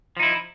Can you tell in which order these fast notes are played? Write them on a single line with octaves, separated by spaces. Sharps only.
F3 D#4 E4